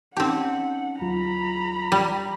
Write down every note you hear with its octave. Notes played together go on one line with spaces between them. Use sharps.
C4 C#4 D#4 G4 F#5 A5
D2 F#3 F4 A#5 B5
G3